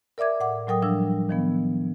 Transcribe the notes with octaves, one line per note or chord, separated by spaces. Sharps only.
A#4 D5 E5 D6 G#6
A2 F#5 D6
A2 F#3 A#4 G5 D#6
F3 G3 D4 E6
D#3 F3 B3